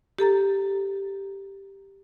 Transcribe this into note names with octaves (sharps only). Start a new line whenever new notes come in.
G4 A4 A#5 A6